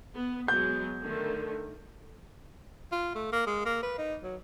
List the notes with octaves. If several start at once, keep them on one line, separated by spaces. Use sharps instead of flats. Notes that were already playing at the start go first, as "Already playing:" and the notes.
B3
F#3 G#3 B3 G6
D3 D#3 A3
F4
A3
A#3
G#3
A#3
B4
D#4
F#3